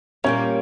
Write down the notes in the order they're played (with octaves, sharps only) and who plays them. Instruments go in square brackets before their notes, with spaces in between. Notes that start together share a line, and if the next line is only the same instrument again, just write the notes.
[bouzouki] A#2 G3 A#3 [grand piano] C#4 C#5